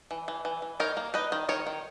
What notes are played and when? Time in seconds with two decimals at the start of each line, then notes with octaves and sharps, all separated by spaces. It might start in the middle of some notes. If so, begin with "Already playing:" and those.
0.11 E3
0.28 E3
0.45 E3
0.62 E3
0.80 D#4 A#4 C#5
0.97 A#3
1.14 D#4 B4 D#5
1.32 D#3
1.49 D#3 A#4 C#5
1.67 D#3